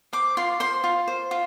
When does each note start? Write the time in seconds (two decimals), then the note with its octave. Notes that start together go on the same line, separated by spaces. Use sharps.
0.13 C5 D6
0.37 F4 C6
0.60 C5 C6
0.84 F4
1.07 C5
1.31 F4